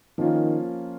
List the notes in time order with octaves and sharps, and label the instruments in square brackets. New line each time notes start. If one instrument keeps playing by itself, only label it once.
[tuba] D#3 [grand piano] F3 A#3 C#4 F4